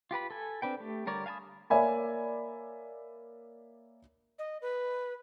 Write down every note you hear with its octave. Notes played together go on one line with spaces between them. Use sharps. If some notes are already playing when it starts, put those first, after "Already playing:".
F4 G4 B4 B5
A4 G#5
C4 D4 B4 G5
A3 G4
D3 G3 A#4 C#5 D5
F5 G#5 A5 B5 D#6
A#3 C#5 D5 E5 G#5 B5
D#5
B4